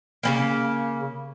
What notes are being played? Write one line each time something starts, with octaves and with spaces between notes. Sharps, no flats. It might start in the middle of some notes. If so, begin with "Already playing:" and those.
C#3 G#3 A#3